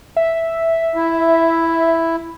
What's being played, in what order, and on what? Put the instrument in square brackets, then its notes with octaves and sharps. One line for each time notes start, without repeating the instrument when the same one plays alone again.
[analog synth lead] E5
[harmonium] E4